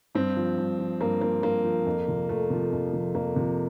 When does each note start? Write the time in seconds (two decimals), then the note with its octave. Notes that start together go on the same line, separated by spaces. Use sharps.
0.15 G2 C4
0.37 F3
0.58 G2
0.79 F3
1.01 G2 A#3
1.21 F3 A#3
1.43 G2 A#3
1.65 F3
1.86 F2
2.08 C3 F3
2.29 F2 A3
2.50 C3 F3
2.72 F2
2.93 C3 F3
3.15 F2 A#3
3.36 C3 F3